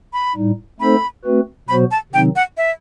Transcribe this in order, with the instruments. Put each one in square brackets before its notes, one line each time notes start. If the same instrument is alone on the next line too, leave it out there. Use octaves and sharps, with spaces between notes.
[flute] B5
[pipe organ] A2 G3 D#4
[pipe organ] A3 C4 D#4 A4 C5 [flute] B5
[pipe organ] A3 C4 F#4 B4
[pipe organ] B2 F#3 B3 F#4 C5 [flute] B5
[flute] A5
[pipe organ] C3 D#3 F#3 C4 D#4 [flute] G5
[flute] F#5
E5